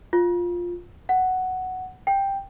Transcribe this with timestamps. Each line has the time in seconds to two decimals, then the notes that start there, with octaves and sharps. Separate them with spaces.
0.13 F4
1.09 F#5
2.07 G5